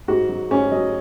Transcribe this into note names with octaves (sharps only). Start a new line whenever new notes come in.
G#2 F#4
F#3
G#2 C#4
F#3 D#5